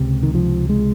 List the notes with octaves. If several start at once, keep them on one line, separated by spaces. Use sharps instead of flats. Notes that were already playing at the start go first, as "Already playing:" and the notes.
Already playing: C#2 C3
D#3
F3
G#3